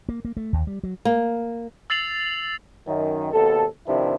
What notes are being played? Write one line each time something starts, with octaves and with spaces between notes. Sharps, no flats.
A#3
A#3
A3
D#2
G3
F#3
A#3
E6 A6 C7 F7 F#7
F#2 D#3
G#1 D#2 B2 A4
G2 C3 D#3 F3 D4 E4